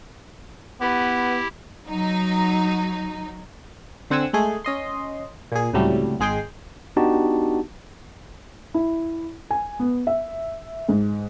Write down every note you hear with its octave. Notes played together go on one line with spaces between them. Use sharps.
B3 E4 G4
F#3 D#4
D3 C4 F#5 G#5 E6
G#3 A3 G#4
C#4 D#5 C6
A#2 G#4
C#2 A2 C3 F#3 G3 A3
G#1 G#3 G#4 G5 C6
B3 D4 D#4 F#4 G4 A5
E4
G#5
B3
E5
G#2